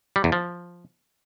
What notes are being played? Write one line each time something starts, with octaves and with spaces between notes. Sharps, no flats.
G3
E2
F3